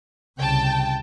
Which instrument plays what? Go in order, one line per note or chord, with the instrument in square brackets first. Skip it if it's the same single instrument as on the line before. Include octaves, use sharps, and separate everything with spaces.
[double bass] C2 C#3 [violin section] G5 A5